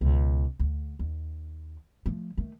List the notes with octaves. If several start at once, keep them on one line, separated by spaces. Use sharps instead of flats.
C#2 B2
D2
D#2
F3 A3
D#3 A3